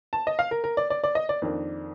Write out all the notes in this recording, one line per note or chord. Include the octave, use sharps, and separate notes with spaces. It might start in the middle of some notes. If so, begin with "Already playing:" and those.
A5
D#5
F5
A#4
A#4
D5
D5
D5
D#5
D5
F2 D#3 A#3 D4